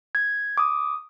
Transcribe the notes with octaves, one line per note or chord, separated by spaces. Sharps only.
G#6
D6 D#6